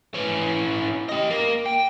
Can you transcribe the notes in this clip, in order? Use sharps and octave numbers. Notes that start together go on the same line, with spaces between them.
E3 C#4
G4 D#5
A#3
G5